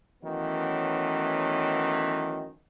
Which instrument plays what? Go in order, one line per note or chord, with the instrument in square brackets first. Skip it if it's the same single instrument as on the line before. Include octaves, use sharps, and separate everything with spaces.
[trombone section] D#3 E3 F#3 A3 B3 C#4